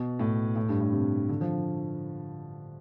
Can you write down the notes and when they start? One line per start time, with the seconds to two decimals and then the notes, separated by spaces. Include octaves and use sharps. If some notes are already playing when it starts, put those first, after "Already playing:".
Already playing: B2
0.19 A2
0.56 A2
0.69 G2
0.80 A2
0.93 C3
1.29 D3
1.41 F3